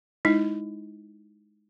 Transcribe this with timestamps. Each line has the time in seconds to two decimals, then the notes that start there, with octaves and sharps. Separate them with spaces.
0.25 G#3 D#4 E4